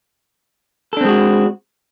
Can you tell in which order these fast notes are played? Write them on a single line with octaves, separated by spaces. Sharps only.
A4 D4 C4 G#3 F#4